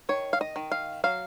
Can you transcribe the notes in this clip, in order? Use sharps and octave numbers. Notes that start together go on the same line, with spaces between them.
D#3 C#5
F5
D#5
D#3
F5
F#3 F5